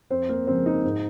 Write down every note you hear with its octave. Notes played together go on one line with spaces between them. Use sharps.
F2 C4 C5
A#3 A#4
C#3 F3 G#3 C4 C5
D#4
G#2